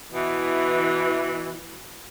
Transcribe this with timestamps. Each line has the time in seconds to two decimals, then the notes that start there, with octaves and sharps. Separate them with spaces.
0.13 B2 E3